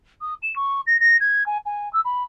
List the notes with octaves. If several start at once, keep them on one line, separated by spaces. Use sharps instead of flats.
D#6
E7
C#6
A#6
A#6
G#6
G#5
G#5
E6
B5